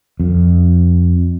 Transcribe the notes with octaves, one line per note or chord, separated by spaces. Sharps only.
F2